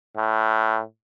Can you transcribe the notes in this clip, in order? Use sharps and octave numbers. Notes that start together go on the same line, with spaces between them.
A2